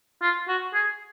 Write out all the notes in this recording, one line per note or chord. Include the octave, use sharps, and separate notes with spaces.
F4
F#4
G#4